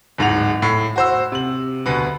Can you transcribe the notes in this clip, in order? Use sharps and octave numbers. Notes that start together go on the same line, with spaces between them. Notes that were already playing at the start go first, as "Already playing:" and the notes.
D1 G#2 F#5 F7
A2
F#4 C5 E6
C3 F#7
D2 B2 B3